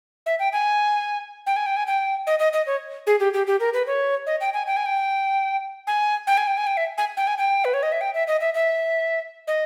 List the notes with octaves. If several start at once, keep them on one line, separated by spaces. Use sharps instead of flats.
E5
G5
G#5
G5
G#5
G5
G#5
G5
D#5
D#5
D#5
C#5
G#4
G4
G4
G4
A#4
B4
C#5
D#5
G5
G#5
G5
G#5
G5
G#5
G5
G#5
G5
G#5
G5
E5
G#5
G5
G#5
G5
B4
C#5
D#5
E5
G5
E5
D#5
E5
E5
D#5